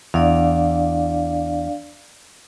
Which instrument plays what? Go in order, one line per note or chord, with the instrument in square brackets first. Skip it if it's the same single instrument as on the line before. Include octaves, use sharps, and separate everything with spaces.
[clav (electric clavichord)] E2 [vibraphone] D4 D5 F5